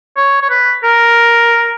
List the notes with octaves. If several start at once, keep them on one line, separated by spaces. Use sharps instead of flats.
C#5
C#5
B4
A#4